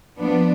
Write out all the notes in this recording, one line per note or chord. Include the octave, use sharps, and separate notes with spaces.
F3 B3 D4